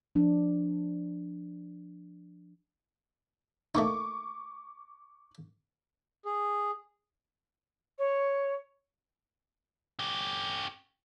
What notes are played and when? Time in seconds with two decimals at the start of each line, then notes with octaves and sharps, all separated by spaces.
0.15 F3 D4
3.75 A3 A#3 D#4 C#6 D6
6.25 G#4
7.98 C#5
9.99 C#4 G4